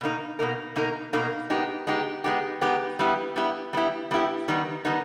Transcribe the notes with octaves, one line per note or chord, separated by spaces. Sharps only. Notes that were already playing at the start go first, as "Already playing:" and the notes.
B2 A#3 D#4 A#4
B2 A#3 D#4 A#4
B2 A#3 D#4 A#4
B2 A#3 D#4 A#4
G#3 B3 D#4 G4
G#3 B3 D#4 G4
G#3 B3 D#4 G4
G#3 B3 D#4 G4
G3 B3 E4 G4
G3 B3 E4 G4
G3 B3 E4 G4
G3 B3 E4 G4
D#3 G3 B3 D#4
D#3 G3 B3 D#4